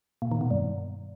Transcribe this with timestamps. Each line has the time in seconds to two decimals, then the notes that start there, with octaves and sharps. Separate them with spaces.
0.22 A#2
0.31 D#3
0.41 B2
0.51 G2